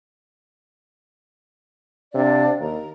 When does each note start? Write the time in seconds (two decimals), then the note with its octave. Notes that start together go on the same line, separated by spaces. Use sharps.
2.14 C3 D4 D5 F5
2.60 D#2 A#5